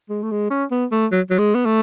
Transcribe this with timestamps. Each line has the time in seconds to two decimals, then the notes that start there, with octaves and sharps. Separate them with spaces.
0.09 G#3
0.23 A3
0.31 G#3
0.50 C#4
0.71 B3
0.92 A3
1.12 F#3
1.30 F#3
1.39 G#3
1.55 B3
1.66 A3